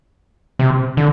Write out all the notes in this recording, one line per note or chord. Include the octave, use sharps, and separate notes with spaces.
C3
D3